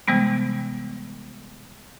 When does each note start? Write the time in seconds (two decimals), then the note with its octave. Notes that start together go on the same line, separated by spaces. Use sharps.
0.08 C3 E3 G3 G#3 B3